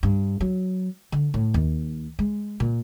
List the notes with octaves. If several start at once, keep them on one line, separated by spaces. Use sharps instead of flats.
G2
F#3
D3
A2
D#2
G#3
A#2